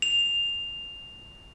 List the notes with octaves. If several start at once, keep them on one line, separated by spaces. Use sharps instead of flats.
F7